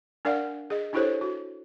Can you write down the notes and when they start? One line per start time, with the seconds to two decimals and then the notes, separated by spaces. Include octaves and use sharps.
0.25 D4 A#4 D5 F5 F#5
0.70 G#4 D#5
0.93 D4 E4 G4 A4 C5 C#5
1.21 F#4